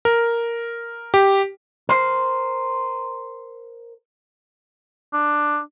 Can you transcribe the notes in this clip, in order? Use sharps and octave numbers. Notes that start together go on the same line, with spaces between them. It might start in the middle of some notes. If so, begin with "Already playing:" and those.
A#4
G4
A#4 C5
D4